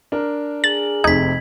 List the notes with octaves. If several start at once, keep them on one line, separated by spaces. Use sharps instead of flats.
D4 A#4
G#4 A6 F#7
F1 C3 D#4 G#6 B6